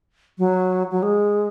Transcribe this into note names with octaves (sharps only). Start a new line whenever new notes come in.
F#3
F#3
G#3